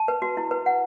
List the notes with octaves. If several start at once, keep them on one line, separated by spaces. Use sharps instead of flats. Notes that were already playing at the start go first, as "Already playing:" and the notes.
Already playing: A5
B4
F#4
E4
B4
F#5